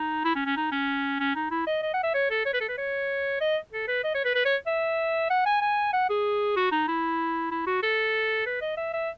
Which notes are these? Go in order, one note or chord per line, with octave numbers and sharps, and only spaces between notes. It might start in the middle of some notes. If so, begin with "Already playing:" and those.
Already playing: D#4
E4
C#4
C#4
D#4
C#4
C#4
D#4
E4
D#5
D#5
F#5
E5
C#5
A4
C#5
B4
A4
B4
C#5
D#5
A4
B4
D#5
C#5
B4
B4
C#5
E5
F#5
G#5
G#5
F#5
G#4
F#4
D#4
E4
E4
F#4
A4
B4
D#5
E5
E5